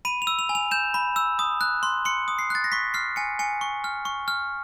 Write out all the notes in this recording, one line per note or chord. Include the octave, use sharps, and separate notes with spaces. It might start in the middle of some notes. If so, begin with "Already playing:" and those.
B5 D#7
F7
E6
F7
G#5
F7
G6 E7
B5
E6
D#6
F#6
C6
C6 C#7
D#6
C7
F#6 A6
A#6
C#6 B6
F6 C7
G#5 C#7
G#5 C#7
C#6
F6
C#6
F6